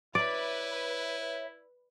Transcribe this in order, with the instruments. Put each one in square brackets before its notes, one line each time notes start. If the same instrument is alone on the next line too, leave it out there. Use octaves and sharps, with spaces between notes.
[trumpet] E4 [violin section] B4 [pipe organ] C#5 E5 [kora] D5